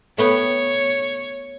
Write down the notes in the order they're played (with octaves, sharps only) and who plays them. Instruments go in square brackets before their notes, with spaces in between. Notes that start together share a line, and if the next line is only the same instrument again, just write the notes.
[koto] A3 B3 G5 [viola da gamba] C#5